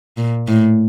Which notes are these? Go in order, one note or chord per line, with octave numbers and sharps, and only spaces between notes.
A#2
A2